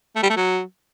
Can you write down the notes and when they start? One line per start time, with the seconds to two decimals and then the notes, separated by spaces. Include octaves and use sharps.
0.16 A3
0.23 G3
0.30 A3
0.37 F#3